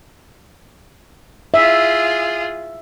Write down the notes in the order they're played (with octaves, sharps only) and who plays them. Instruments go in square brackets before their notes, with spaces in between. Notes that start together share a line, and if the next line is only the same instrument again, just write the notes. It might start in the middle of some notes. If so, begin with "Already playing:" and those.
[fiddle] F4 G#4 [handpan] E5